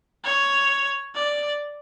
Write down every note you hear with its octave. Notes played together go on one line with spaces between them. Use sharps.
C#5
D5